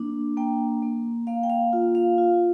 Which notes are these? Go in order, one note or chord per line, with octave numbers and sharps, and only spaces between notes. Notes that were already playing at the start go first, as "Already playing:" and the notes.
Already playing: A#3 D4
A#3 G5
A#3
A#3 F5
G5
F5
F4
F5
F4